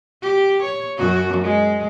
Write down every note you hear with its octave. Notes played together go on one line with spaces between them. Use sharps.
G4
C#5
F#2 F#4
G#3